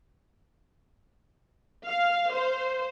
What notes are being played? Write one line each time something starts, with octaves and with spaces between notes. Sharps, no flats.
F5
C5